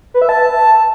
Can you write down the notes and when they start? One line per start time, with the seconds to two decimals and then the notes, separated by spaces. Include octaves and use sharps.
0.14 B4
0.22 E5
0.29 A5